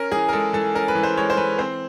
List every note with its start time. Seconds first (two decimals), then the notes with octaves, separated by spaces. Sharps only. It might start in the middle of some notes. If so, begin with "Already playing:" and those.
Already playing: C#4 A#4
0.12 E3 G#4
0.29 A#4
0.33 G#3 A4
0.53 E3 A4
0.75 C#4 A#4
0.88 B4
0.95 E3
1.03 C5
1.17 G#3 C#5
1.30 C5
1.37 E3 B4
1.58 C4 C5